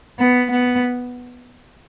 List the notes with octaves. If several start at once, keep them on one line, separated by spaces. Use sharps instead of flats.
B3
B3